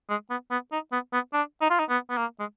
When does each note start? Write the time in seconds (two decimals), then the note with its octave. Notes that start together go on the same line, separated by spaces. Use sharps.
0.09 G#3
0.30 B3
0.51 B3
0.72 D#4
0.92 B3
1.13 B3
1.34 D4
1.62 D#4
1.71 F4
1.79 D#4
1.89 B3
2.10 B3
2.17 A#3
2.40 G#3